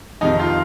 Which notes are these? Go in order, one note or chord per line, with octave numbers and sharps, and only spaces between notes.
F2 C3 D#3 D#4
F4